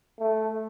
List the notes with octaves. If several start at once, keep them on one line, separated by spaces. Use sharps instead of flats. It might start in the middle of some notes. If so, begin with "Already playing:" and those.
A3